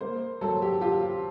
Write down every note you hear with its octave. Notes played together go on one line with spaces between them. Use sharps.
A#3 C5
F#3 A4
G4
F4 G4